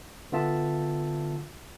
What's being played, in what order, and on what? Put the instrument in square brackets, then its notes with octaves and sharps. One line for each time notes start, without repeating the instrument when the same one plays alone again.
[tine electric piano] D3 B3 F4 E5 A5